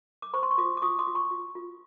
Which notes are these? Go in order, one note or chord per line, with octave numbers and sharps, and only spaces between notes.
D6
C5 B5 C#6
C6
C#6
F4 C6 D6
D6
F4 C#6 D#6
C6 D6
F4
B5 C#6
F4
F4